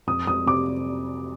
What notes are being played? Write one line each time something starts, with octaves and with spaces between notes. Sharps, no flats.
F2 D#6
F2 D#6
C3 D6